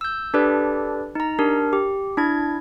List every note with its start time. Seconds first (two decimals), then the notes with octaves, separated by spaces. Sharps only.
0.01 E6 G6
0.34 D4 G4 A4 B4 D5
1.15 D#4 A#5
1.39 D4 G4 A#4
1.73 G4
2.17 D4 E4 G#6